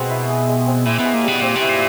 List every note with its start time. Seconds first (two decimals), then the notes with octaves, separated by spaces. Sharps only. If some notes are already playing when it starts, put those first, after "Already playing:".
Already playing: B2 G#3 C4 G#4
0.10 E4
0.29 G#4
0.49 G#3
0.67 C4
0.85 A#2 E4
0.99 B2
1.05 G#4
1.14 A#2
1.23 B2 G3
1.41 A#2 C4
1.56 B2
1.61 E4
1.69 A#2